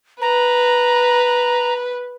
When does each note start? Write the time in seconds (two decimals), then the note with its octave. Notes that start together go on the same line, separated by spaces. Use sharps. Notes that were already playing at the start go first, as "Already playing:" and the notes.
0.21 B4 A#5